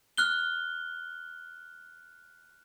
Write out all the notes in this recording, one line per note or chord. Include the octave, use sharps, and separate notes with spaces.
F6 F#6 G7